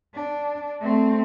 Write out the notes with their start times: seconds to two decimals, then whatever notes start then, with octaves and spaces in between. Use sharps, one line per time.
0.14 D4
0.81 A3 C4